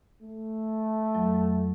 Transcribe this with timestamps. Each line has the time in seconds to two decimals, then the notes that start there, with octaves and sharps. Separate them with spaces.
0.22 A3
1.15 F2 F#3